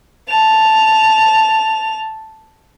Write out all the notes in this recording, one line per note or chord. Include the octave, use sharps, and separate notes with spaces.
A5 F7